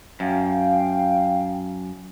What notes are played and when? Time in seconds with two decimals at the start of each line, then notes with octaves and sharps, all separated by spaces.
0.20 F#2 F5 G5